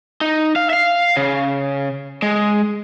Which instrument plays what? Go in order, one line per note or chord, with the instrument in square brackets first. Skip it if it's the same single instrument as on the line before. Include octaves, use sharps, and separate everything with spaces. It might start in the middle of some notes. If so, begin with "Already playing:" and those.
[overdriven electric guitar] D#4
F5
E5 F5
C#3
G#3